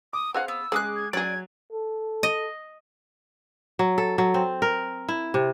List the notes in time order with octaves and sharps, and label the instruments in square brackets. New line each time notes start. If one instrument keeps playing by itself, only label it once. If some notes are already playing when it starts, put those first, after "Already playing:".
[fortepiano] D6 [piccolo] D#6
[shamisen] C4 G#4 F5 [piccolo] F#5
[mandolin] B3 [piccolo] E6
[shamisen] C#3 [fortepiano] G#3 [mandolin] G#4 D6 F#6
[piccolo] G#6
[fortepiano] F#3 [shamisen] C#4 G#4 [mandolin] D5 [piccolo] G#6
[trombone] A4
[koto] D#5
[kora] F#3
A4
F#3
C4
A#4
E4
C3